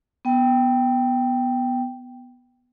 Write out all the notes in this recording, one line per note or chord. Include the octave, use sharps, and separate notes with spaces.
B3 G5